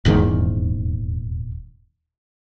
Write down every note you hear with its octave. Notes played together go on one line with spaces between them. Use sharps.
D#1 E2 G#2 D#3